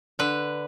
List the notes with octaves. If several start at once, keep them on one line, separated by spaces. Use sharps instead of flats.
D3 B4